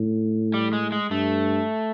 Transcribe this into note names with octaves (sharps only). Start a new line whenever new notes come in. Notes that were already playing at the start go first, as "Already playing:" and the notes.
Already playing: A2
G3
G#3
G#3
G2 A3